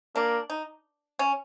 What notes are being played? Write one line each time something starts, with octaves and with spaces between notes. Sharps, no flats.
A#3 D4
D#4
C#4